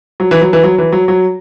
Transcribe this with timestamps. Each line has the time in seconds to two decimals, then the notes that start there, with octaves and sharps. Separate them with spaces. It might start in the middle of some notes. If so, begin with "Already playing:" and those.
0.20 F#3
0.31 E3
0.41 F#3
0.53 E3
0.63 F#3
0.78 E3
0.92 F#3
1.08 F#3